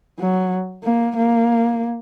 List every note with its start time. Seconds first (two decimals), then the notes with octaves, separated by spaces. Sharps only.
0.19 F#3
0.84 A#3
1.16 A#3